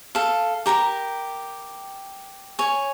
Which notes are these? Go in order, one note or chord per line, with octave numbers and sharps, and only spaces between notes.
A4 F5
G4 A#4 G5 B5
C#5 G#5